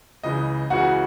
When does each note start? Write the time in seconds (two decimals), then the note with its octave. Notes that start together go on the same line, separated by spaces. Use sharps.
0.23 C#2 C#3 E3 D#5
0.70 C#2 C#3 E3 F#4 F#5